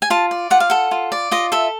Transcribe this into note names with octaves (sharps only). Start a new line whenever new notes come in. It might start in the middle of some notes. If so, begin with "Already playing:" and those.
G#5
F4 A5
D5
F4 F#5
F5
A4 F#5
F4
D5
F4 D#5
A4 E5